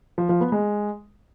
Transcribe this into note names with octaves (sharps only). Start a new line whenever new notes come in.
F3
F3
B3
G#3